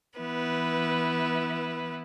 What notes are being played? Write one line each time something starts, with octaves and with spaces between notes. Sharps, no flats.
E3 B3 E4 B4